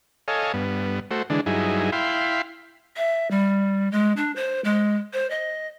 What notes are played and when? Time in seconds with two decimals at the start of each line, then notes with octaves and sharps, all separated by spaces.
0.28 A4 C#5 D#5 F5 G#5
0.54 G2 B3
1.11 A3 F#4 C5
1.30 D3 E3 G#3 D4
1.46 G2 F#3 D#4 E4 G#4
1.92 E4 F5 G5 B5 C6
2.96 E5
3.31 G3
3.92 G#3
4.16 D4
4.36 C5
4.64 G#3
5.13 C5
5.30 D#5